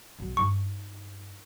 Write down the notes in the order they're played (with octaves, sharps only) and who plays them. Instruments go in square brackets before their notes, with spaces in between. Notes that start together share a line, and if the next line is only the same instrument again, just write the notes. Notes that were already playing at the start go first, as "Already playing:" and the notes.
[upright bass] B1 F#3
[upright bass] G2 D#4 [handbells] C#6